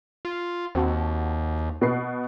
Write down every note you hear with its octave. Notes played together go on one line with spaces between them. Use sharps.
F4
D#2 C4 F#4 A5
B2 B4 C7